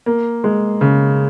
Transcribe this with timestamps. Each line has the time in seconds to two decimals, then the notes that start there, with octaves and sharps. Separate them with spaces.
0.06 A#3
0.44 G#3
0.81 C#3